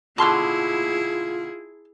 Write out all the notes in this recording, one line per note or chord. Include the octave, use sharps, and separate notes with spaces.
B2 D3 E4 F4 G#4 A5 C6 F6